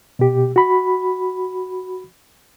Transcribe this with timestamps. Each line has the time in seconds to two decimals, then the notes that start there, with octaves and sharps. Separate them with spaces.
0.19 B2 G4
0.56 F#4 B5